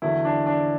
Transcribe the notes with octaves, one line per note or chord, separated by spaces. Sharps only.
E2 D3 F#3 E4
D4
D4